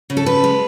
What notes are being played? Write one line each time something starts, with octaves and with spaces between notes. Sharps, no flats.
C#3
A4
C#3 B4
G#3